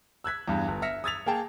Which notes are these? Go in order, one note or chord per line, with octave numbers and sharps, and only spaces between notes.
E6 F#6 G#6 B6
E2 G2
G1
E5 F6 A#6 B6 C#7
D#6 E6 G#6 A6 B6 F7
A#3 G#4 G5 A5